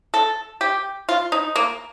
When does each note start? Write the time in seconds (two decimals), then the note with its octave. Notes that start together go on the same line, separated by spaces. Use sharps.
0.14 A4
0.61 G4
1.09 F4
1.32 D#4
1.56 A#3